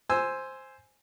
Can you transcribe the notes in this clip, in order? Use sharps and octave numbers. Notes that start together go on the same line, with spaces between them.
C5 G#5 E6